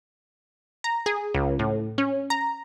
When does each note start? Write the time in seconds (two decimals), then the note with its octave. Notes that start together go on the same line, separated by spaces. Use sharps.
0.84 A#5
1.06 G#4
1.34 C#2
1.59 A2
1.98 C#4
2.30 A#5